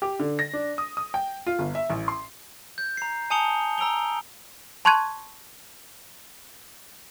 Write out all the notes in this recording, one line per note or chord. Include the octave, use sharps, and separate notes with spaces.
G4
D3
A#6
D4
D#6
D#6
G5
F4
G1
E5
A1
C6
G6
A#5 C7
G#5 A5 D#6 C#7 F7 G7
A#5 E6 D7 F7 G7
A5 C6 C#6 F#6 G#6 D#7